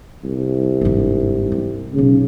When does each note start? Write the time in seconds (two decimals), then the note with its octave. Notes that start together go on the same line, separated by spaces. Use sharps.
0.24 C2
0.81 G1 G#2
1.52 C4
1.94 B1 G2 C#3